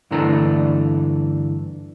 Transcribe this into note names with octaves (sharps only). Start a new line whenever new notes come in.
G2 D3 E3 A3 D4 A#5